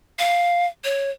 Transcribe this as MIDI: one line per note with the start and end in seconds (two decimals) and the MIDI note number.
0.19 0.66 77
0.84 1.10 73